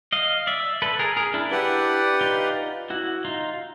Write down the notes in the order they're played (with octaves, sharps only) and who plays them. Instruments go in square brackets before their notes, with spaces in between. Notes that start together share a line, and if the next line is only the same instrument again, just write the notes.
[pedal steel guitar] D#5 F5
D5 E5
A4 B4
G#4 A#4
G#4 A#4
D4 E4
[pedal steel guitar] D4 E4 [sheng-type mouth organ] G4 B4 D5 F#5
[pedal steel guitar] D#4 F4
E4 F#4
D#4 F4